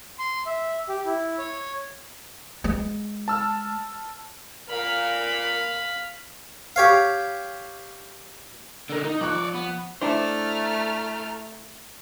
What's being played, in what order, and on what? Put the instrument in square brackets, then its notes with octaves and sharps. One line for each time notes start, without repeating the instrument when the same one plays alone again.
[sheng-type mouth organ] C6
E5
G4
E4
C#5
[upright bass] G#3
[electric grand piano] A5 E6 F6
[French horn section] A#2 A#4 [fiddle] F5 B5
[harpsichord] G4 C#5 F5
[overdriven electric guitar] D3 A#4
D#4
[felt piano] F3 C#6 F#6 [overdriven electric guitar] C#5 D5
[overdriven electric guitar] B3
[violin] A3 F6 [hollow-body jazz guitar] D4 E4 C5 [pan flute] A#5